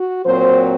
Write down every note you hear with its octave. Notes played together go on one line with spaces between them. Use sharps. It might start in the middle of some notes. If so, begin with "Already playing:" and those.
Already playing: F#4
A#2 F#3 C4 C5